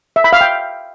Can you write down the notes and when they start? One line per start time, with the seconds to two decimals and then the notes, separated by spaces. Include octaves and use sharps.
0.16 E5
0.24 B5
0.33 F5
0.41 G5